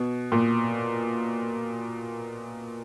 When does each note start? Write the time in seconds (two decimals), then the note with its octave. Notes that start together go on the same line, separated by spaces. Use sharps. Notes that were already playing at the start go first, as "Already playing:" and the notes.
Already playing: B2
0.32 A#2